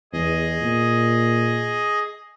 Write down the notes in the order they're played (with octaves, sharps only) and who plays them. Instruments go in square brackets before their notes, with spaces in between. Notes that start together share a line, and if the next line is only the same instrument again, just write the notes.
[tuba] E2 [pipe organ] G#4 D#5
[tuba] A#2